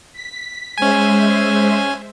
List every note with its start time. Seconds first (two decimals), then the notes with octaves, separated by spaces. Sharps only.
0.13 B6
0.78 G#3 C#4 C5 E5 G#5